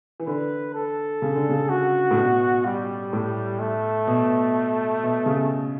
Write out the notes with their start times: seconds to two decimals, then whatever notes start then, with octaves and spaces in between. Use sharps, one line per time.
0.20 E3
0.27 D3 B4
0.74 A4
1.22 C#3
1.35 D3
1.49 C#3
1.70 F#4
2.11 A2
2.18 B2
2.65 G3
3.13 A2
3.60 A3
4.07 B2
5.03 B2
5.26 C#3